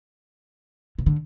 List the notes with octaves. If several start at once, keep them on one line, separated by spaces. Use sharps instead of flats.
C3
D3